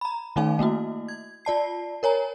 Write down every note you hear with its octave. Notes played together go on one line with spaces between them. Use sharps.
A#5 B5
D#3 A3 C#4 D#4 F5 G#5
A3 A#3 E4 F#4
G#6
F4 D5 A5 C7
A#4 C#5 G#5 A#5